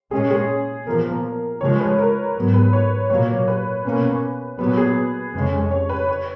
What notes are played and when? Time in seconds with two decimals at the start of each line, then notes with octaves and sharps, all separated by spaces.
0.11 A#2 G#3 C#4 G#4
0.31 G#4
0.86 A#2 F3 B3 A#4
1.61 C#3 F3 G#3 C#5
1.79 B4
1.98 A#4
2.35 G#2 F#3 B3
2.54 B4
2.73 C#5
3.10 A#2 F#3 A#3 C#5
3.48 B4
3.84 B2 A#3 C#4
4.59 A#2 F#3 B3 B4
4.77 G#4
5.34 F2 C#3 G#3 C#4
5.71 C#5
5.89 B4
6.08 C#5